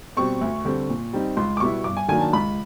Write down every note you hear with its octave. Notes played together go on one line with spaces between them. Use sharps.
B2 G3 C4 C#6
D2
D3 G3 C4
A#2
G3 C4 D#4
C#2 C6
D6
B2 G3 B3 E4 C#6
G2 D6
G#5
D#3 F#3 A#3 D4 G#5
A5
C#2 B5